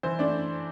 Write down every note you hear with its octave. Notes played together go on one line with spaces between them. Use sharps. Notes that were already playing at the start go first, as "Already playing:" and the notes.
E3 C5
A3 D4 D5